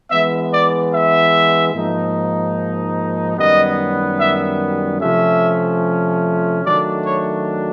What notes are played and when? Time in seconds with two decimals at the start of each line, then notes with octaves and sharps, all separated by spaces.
0.11 E3 G#3 B3 E5
0.53 D5
0.93 E5
1.74 G#2 F3 A#3 D#4
3.37 F#2 D#3 G3 B3 D#5
4.19 E5
5.01 C3 F3 A3 C#4 E5
6.65 D#3 F#3 A3 D4 D5
7.06 C#5